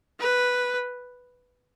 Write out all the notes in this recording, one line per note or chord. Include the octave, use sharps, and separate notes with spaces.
B4